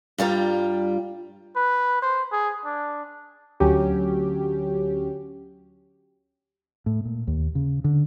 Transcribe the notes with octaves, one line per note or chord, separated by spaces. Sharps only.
G2 G3 F4 A#5
B4
C5
G#4
D4
D2 F#3 C#4 G4
A2
A#2
D#2
C#3
D3